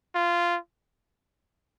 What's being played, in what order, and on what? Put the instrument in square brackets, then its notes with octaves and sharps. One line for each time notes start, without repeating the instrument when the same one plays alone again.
[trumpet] F4